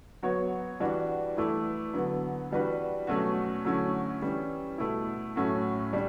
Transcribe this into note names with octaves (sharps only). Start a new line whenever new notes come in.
F#3 B3 F#4 C#5
E3 G3 D4 F#4
E3 A3 E4
D3 F#3 B3
E3 G3 D4 F#4 B4
B2 F#3 A3 C#4 F#4
D3 F#3 A3 C#4 E4
E3 G3 C#4
B2 A3 E4
A2 F#3 A3 C#4 F#4
G3 D4